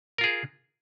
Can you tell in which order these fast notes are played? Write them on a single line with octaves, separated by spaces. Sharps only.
A#4 F4 G#4